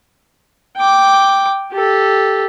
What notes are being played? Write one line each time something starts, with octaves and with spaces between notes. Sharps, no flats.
G5 D6
G4 A4